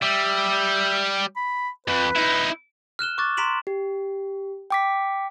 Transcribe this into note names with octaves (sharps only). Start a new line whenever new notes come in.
G3 E5
B5
F2 B4
D#4 E4
F6 F#6 E7 G7
C#6 D6 F#6 A6
A#5 C6 B6 D7 E7 F#7
G4
G5 D6 B6